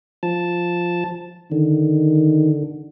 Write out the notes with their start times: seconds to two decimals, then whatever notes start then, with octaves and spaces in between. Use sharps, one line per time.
0.23 F3 A5
1.52 D3 D#3